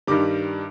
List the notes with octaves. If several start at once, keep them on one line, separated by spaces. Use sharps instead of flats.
G2 D#3 G3 D6